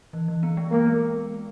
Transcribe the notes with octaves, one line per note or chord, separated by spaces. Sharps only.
E3
E3
B3
G#3
G#3 A#3
B3